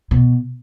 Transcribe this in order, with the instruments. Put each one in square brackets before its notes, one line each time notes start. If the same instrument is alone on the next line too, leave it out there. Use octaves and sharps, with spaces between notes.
[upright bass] B2